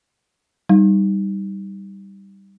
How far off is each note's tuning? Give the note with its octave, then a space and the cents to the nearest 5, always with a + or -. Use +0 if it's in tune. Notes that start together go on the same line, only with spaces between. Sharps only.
G3 +0 D#4 +0